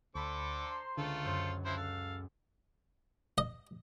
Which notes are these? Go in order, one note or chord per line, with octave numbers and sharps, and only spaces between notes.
D2 D3 A4 C5 B5 D6
A#5 C6
C#2 D3 A3 F4 A4
F#2 C5
F3 E4 C5 C6 F#6
A4 F5
D#5